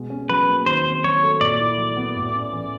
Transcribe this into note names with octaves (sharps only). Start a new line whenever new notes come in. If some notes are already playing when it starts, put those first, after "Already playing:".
Already playing: B2 G#3
C#4
F#3 B4
A#3
D#3 C5
C4
F#3 C#5
A3
A#2 D5
E4
F#3
B3
A2
C#4
E3